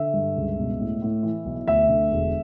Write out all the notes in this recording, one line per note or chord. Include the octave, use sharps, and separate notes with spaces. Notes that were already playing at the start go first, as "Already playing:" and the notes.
Already playing: D3 E5
G2
C#2
B2
A2
A2
E3
B1
D2 E5
D3
E1